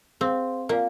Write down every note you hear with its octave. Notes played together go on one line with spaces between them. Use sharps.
C4 G#4 C5 F5 C6
A#3 F4 A#4 D5 F5 G#5